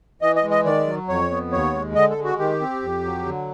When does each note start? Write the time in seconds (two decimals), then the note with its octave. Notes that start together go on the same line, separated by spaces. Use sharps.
0.22 E3 D#5
0.36 D#5
0.43 G#3
0.51 D#5
0.65 D#3 D5
0.87 F#3
1.08 F2 C#5
1.31 B3
1.52 D#2 C#5
1.74 G#3
1.95 D3 D#5
2.10 A4
2.17 G#3
2.24 F#4
2.39 D#3 G4
2.61 C4
2.82 F2
3.04 F#3
3.26 D3